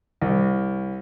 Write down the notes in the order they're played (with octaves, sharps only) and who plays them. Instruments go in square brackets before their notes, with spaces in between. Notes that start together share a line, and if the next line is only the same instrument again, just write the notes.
[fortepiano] C2